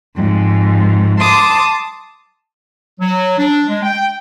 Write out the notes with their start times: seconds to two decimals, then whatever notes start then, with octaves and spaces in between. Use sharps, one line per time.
0.15 F2 G#2
1.20 A5 C6 D6 D#6
3.00 F#3
3.39 D4
3.68 G#3
3.83 G5